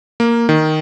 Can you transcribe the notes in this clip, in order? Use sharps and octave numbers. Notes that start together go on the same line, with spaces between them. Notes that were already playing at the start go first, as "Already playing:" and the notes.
A#3
D#3